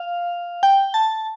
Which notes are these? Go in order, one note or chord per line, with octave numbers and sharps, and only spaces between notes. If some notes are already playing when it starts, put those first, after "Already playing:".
Already playing: F5
G5
A5